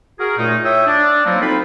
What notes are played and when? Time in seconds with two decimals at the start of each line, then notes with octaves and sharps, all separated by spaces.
0.19 F#4 G#4 A#4
0.37 F#2 A#2 A3 D#4
0.64 E4 C#5 E5 G5 D#6 E6
0.87 D4
1.25 F3 F#3 A#3 C4 D#4 E4
1.40 D2 C4 D#4 F4 B5